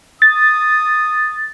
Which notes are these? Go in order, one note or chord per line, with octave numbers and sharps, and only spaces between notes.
D#6 A6